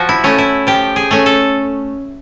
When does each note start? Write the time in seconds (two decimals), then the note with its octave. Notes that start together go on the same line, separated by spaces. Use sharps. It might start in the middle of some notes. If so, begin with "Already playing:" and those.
Already playing: F3 F#4
0.09 E4
0.24 A3 C#4
0.38 E4
0.67 F3 G4
0.96 G#4
1.11 A3 C#4
1.26 A4